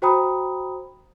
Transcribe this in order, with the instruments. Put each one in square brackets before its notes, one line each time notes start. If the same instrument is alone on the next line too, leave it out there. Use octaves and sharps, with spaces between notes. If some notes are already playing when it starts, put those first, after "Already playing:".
[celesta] F#4 C5 G5 A#5 B5 D#6